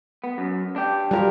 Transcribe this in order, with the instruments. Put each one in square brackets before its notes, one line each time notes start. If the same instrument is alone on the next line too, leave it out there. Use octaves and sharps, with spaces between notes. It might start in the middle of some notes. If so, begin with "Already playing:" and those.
[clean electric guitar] B3
F#2
D4 G4
[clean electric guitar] F#3 A#4 [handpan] G3 F4 G4